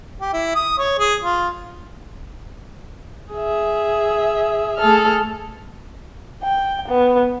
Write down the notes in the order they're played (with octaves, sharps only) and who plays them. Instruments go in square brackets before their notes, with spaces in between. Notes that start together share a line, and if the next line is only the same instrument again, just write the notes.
[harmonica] G4
E4
D#6
C#5
G#4
F4
[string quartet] G#4 E5
A3 G#4 A4 F6
[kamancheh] G5
B3